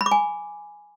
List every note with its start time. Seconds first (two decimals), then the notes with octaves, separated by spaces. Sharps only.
0.01 B5
0.06 D6
0.11 G#5